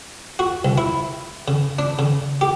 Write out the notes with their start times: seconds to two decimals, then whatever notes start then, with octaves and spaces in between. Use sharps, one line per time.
0.39 F#4
0.65 C2
0.78 E4
1.48 C#3
1.79 D4
1.99 C#3
2.41 G4